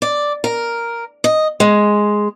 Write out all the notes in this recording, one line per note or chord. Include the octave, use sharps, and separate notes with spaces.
D5
A#4
D#5
G#3